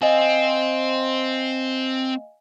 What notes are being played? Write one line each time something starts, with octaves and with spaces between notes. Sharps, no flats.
C4 D#5 F5 G#5